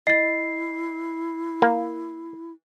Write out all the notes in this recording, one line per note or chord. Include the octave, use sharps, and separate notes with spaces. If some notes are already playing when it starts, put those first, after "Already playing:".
E4 D#5 A6 C7
A#3